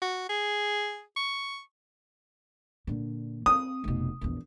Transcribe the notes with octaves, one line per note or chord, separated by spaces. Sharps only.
F#4
G#4
C#6
A#2 D3
C4 D#6
F1 B2
A#1 E2